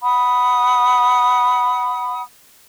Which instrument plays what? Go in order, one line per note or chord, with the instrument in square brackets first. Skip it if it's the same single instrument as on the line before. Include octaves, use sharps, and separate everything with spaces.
[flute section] F#5 B5 D#6